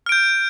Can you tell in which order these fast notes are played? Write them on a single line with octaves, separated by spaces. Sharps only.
F6 D7 G6